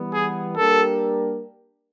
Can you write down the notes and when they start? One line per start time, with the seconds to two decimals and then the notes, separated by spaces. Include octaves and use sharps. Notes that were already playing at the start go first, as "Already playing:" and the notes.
Already playing: E3 G3 B3
0.13 G#4
0.56 G3 A#3 D4 G4 A4 A#4